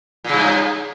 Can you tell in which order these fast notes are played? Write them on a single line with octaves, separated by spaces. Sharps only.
A#2 C#3 G2